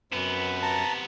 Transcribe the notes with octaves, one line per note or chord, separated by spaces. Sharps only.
F#2 C3 B3 B4
A5 A#5